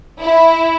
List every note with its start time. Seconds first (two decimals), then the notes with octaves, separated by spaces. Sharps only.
0.21 E4